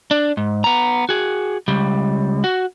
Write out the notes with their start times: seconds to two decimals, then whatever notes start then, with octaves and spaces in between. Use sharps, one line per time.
0.11 D4
0.37 G#2
0.64 B3 A#5
1.09 F#4 G#4
1.68 C#2 G3
2.44 F#4